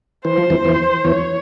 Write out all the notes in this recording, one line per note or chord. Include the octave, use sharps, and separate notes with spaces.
E3 C5
F3
E2 E3
E2 E3
E2 E3 C#5